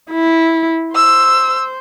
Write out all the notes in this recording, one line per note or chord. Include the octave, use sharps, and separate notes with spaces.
E4
C5 E6